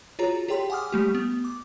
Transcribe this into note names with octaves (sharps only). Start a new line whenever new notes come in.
F4 F#4 G#4 C#5 A#5
G4 G#4 C#5 G5 C6
F#5 G#5 D6 D#6 F6
G3 A3 G4
B3
D6